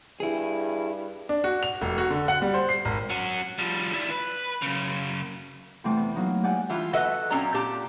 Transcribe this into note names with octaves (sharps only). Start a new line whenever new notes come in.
G2 E4 G#4
D4
F#4
F7
F1
F#4
D3
F#5
G3
C5
C7
G#1
C#4 F#4
F3 G3
E4 D5
B4
F#2 C#3
E2 C3 A3 C4 D6
B3
F#3 A#3 B3 D#4
G#3 G4 D5 F#5 G#5
E3 G3 F4
F#4 A4 B4 D#5 E5 F#5
A#2 F#3 C4 C#4 D5 A#5
A#2 G4 A5